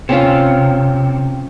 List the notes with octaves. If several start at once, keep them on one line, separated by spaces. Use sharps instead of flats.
C3 C4 C#4 F4